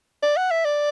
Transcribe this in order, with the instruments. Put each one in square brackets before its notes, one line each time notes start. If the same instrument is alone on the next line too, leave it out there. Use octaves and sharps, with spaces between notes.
[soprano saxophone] D5
F#5
E5
D5